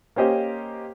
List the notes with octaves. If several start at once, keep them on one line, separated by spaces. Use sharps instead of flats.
A#3 C#4 G4 C5 D#5